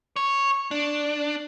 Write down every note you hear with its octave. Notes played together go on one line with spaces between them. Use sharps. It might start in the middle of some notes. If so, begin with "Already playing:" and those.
C#5
D4